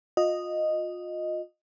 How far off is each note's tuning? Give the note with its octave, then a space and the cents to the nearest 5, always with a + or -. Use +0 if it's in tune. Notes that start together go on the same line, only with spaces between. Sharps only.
F4 +30 D#5 -5